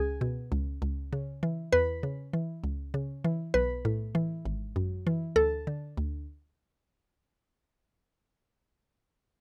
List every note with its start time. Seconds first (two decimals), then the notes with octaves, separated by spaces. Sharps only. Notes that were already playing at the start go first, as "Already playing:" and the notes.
Already playing: C#2 G#4
0.21 B2
0.52 C#2
0.82 C#2
1.13 C#3
1.43 E3
1.73 E2 B4
2.03 C#3
2.33 E3
2.64 C#2
2.94 C#3
3.24 E3
3.54 B1 B4
3.85 A2
4.15 E3
4.45 G#1
4.76 F#2
5.07 E3
5.36 D2 A4
5.67 D3
5.97 D2